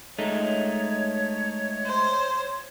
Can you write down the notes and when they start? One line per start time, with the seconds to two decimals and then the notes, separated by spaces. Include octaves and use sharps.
0.19 G#3 A3 D#4 C#5
1.86 C5